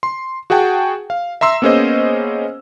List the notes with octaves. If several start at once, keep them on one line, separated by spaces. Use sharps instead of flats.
C6
F#4 G#4 F#5 G5 A5
F5
E5 A#5 C6 E6
A#3 B3 C#4 G#4 C5 D#5